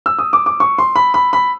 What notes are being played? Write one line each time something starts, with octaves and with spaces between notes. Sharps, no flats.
E6
D#6
D6
D6
C#6
C6
B5
B5
B5